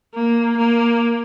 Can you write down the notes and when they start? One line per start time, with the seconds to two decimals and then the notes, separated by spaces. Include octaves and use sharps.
0.15 A#3
0.58 A#3